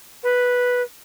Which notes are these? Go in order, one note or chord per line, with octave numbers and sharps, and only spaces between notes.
B4